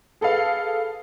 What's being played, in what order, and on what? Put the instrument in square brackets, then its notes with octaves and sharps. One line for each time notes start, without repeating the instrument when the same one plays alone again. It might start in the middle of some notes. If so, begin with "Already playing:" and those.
[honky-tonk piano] G#4 A4 B4 F5